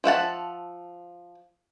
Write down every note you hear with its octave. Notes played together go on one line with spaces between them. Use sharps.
F3 E5 F#5 A5